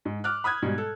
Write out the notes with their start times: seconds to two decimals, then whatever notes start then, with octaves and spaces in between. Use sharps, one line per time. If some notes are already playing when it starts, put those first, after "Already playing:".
0.05 G#2
0.24 D6 F6 F#6
0.44 B5 D#6 F#6 G#6
0.62 G#2 B2 G3
0.78 A4